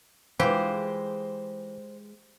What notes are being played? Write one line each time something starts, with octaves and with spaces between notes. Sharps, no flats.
E3 G#3 F4 G4 C5